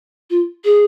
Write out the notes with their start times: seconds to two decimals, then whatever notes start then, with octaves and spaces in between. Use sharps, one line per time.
0.30 F4
0.65 G#4